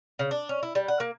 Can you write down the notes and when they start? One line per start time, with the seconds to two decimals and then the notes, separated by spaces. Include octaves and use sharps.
0.19 C#3
0.31 D4
0.49 C#4
0.63 E4
0.75 G3
0.88 F#5
1.00 A#3